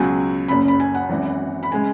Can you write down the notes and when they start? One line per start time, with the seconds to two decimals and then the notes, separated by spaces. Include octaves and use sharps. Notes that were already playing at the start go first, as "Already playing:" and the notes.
Already playing: C#2 B2 F#3 G#5
0.48 F#1 F#2 C#3 B5
0.68 B5
0.80 G#5
0.95 F#5
1.10 G#1 F#2 E3
1.63 B5
1.72 C#3 G#3 G#5